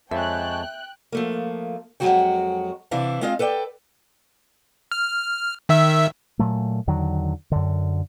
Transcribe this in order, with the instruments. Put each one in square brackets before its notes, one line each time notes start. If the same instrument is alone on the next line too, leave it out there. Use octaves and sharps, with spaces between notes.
[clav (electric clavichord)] F2 [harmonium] G#3 C#5 A5 [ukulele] E5 [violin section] G5 F#6
[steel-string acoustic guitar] F3 A3 A#3
F2 F3 F#3 G#3 F#4 G5
C3 E3 D4 E4 F5
G#3 C4 F4 D#5 F5
A4 B4 D5 F#5 G5
[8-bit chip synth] F6
D#3 E5 E6
[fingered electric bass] A#2 F#3 A3
E2 D3 D#3 F#3
F#2 D3